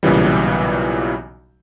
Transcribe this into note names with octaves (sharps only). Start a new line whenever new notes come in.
B1 A#2 C#3 E3 G3